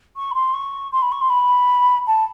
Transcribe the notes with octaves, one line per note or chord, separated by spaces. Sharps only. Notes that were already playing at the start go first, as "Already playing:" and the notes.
C#6
B5
C6
C#6
C6
B5
C#6
C6
B5
A5